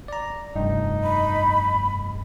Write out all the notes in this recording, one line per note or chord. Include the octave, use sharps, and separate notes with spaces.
D5 A#5
F1 G2 D#4
B5